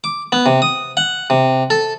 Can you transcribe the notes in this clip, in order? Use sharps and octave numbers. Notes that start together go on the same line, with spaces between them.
D6
B3
C3
D#6
F#5
C3
A4